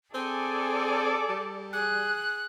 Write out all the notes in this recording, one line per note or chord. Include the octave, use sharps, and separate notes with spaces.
C4 G#4 A4 D5 G#5
G3
G#4 F#6